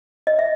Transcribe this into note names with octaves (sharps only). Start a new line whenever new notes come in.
D#5
E5